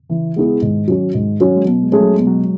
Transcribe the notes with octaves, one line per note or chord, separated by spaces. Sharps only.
C#3 E3
G#3 B3 E4 G#4
G#2 D#3
F#3 C#4 F#4
G#2
F#3 C#4 F#4
G#3
B2 F#3
G#3
A3 C#4 G#4
F#3
B2 G#3
F#3